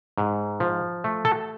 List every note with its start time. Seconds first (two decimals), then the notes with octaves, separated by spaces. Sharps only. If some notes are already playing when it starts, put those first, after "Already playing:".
0.18 G#2
0.60 F3
1.04 A3
1.25 A4